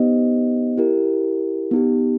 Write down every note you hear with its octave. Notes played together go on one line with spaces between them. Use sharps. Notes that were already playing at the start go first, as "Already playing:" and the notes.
Already playing: B3 D#4 G4 C5 D#5
E4 G4 A#4
B3 D#4 G4